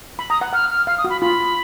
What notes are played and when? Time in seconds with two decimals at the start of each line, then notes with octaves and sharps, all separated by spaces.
0.19 B5
0.30 A#5 D#6
0.41 F#5
0.53 F#5 F6
0.70 F6
0.87 F5 F6
0.98 D#6
1.04 F#4
1.10 B5
1.21 F4 B5